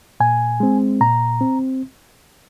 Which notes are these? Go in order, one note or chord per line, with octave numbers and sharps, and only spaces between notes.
A#2 G#5
G#3 C4
A#2 A#5
C4